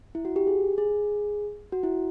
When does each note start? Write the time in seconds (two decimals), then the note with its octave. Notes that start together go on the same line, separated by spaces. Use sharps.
0.15 E4
0.25 F#4
0.36 G4
0.47 G#4
0.78 G#4
1.72 F#4
1.83 E4